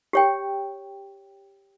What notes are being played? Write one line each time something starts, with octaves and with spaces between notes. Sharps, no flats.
G4 C#5 G5